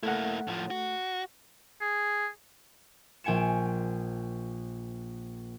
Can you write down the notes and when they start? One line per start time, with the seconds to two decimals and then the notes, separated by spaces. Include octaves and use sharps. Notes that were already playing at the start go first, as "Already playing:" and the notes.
0.03 A3 A#3 E4 F#5
0.48 A2 F3
0.71 F#4
1.81 G#4
3.24 A#1 G5 G#5 C#7 E7